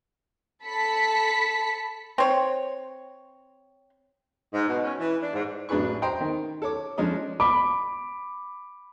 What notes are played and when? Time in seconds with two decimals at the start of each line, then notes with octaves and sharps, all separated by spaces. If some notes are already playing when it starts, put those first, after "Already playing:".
0.65 A4 A5 B5 B6 C#7
2.18 C4 C#5
4.53 G#2
4.66 B2
4.83 C#4
4.98 E3
5.21 D4
5.33 G#2
5.69 A1 F#3 D4 G#4 B4 C#6
6.02 C5 D#5 G5 A#5 C6
6.20 D#3
6.62 A4 C#5 D6
6.98 F3 G#3 C#4 D4 D#5
7.40 B5 D6